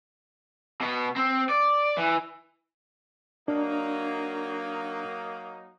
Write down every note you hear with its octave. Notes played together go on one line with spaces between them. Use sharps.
B2 B3
C4
D5
E3
F#3 A#3 D4 D#4